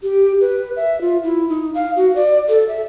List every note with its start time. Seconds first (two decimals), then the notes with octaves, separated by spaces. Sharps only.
0.03 G4
0.41 B4
0.76 E5
1.01 F4
1.24 E4
1.49 D#4
1.75 F5
1.96 F#4
2.15 D5
2.49 A4
2.68 E5